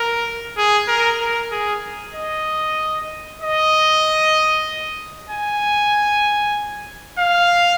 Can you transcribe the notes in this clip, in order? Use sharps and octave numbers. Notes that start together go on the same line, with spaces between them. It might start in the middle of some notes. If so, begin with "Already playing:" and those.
Already playing: A#4
G#4
A#4
A#4
G#4
D#5
D#5
G#5
F5